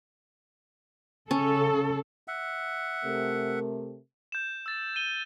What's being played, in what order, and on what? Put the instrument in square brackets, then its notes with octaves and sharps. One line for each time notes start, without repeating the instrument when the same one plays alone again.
[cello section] C#3 A4 [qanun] C#4
[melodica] E5 F#5
[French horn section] C3 A3 A#4
[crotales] G6 E7
E6 A6
D#7 G7